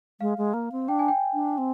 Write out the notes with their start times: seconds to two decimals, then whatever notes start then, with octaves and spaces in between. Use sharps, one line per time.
0.21 G#3 F5
0.38 G#3
0.54 A#3
0.72 C4
0.88 D4 G5
0.99 G#5
1.08 G5
1.34 D4
1.58 C4